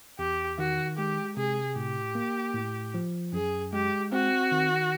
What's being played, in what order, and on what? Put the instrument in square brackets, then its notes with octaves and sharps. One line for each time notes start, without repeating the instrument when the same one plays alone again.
[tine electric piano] E2 [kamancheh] G4
[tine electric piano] D#3 [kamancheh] F#4
[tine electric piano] G#3 [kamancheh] G4
[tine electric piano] C3 [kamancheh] G#4
[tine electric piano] A2 [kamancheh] G4
[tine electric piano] A#3
A2
F3
[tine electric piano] F#2 [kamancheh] G#4
[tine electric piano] G#3 [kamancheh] G4
[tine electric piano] C4 [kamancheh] F#4
[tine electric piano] D#3